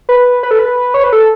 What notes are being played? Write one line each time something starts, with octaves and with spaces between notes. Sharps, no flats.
B4
B4
A4
B4
C#5
B4
A4